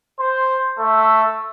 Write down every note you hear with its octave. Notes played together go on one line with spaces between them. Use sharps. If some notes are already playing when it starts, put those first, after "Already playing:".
C5
A3 E5